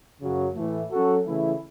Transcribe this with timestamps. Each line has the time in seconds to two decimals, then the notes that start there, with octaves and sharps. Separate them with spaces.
0.21 F#2 C#3 F#3
0.56 A2 E3 A3
0.91 F#3 C#4 F#4 A4
1.26 C#3 E3 A3 E4